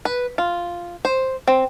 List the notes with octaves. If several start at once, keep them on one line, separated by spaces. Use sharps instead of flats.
B4
F4
C5
C4